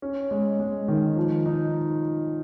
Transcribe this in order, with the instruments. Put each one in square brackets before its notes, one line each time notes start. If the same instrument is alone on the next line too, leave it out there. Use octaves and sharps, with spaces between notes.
[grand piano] C#4
G#3
G#3
D#3
F3
D#4